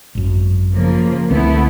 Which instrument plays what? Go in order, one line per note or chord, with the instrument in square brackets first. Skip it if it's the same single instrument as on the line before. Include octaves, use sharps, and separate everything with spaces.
[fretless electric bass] G#1 F#2
[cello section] C#3 F3 A#3
[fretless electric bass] C#2 D3 C4 [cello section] A3 B3 E4